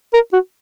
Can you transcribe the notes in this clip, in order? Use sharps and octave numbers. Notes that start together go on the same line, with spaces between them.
A#4
F#4